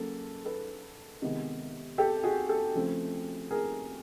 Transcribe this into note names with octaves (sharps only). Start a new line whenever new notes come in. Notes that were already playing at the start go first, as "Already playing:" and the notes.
Already playing: C#3 F#3 A#3 A4
A4 B4
C3 D#3 G#3 B3
G4 A4
F#4 G#4
G4 A4
C#3 F3 A3 C4
G#4 A#4